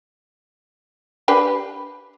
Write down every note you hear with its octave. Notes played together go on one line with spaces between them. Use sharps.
D4 G4 B4